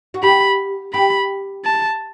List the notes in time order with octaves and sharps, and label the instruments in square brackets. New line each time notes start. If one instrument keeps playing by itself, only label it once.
[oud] F#4
[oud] G4 [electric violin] B5
[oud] G4 [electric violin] B5
[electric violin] A5